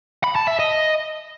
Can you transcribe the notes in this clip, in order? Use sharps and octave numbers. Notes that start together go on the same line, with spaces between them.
B5
A5
E5
D#5